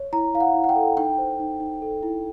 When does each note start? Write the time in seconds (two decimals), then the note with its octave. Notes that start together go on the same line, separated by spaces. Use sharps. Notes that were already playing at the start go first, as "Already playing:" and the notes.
Already playing: C#5
0.13 E4 A#5
0.34 E4 F5
0.40 F#5
0.54 E4
0.64 F#5
0.69 G5
0.76 A4
0.97 D#4 G5
1.18 C5
1.40 D#4
1.60 D#4
1.82 A4
2.03 E4